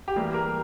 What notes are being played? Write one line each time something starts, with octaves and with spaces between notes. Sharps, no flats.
G4
E3 G3 A#3 G#4
A#4